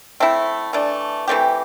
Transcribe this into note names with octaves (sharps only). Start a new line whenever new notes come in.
A3 C4 E4
E3 A3 D4
E3 A3 C4 G4